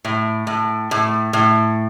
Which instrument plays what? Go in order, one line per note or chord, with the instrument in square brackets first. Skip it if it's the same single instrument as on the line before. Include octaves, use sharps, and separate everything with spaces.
[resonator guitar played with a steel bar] A2
A2
A2
A2